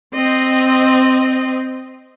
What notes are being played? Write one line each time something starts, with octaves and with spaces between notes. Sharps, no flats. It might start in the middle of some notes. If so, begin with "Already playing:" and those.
C4 D#5